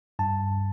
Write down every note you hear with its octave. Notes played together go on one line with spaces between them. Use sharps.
G2 A5